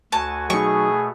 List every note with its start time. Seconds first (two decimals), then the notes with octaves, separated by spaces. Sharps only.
0.12 D2 F#4 G#5 A5
0.50 B2 F#3 A3 D#4 G#4 C#6